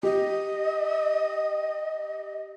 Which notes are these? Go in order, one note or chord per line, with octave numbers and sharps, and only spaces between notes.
G4 D#5